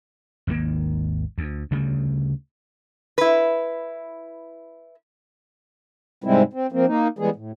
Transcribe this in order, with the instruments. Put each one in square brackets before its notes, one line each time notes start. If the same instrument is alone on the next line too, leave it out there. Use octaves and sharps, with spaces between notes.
[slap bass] G#1 D#2 D#3 A#3
D2
D2 C#3 G3 A3
[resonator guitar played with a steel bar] E4 B4
[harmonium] G#2 C3 G3 G#3 C4 E4
C4
F3 A#3 C4
A#3 D#4
E3 G3 G#3 B3 G#4
A2